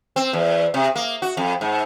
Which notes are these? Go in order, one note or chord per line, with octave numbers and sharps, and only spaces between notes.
C4
E2
C3
A#3
F#4
F2
G#2